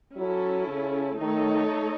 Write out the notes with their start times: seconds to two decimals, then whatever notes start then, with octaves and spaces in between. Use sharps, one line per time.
0.17 F#3 C#4 E4 A4
0.67 C#3
1.18 D#3 A3 D#4 A4 C#5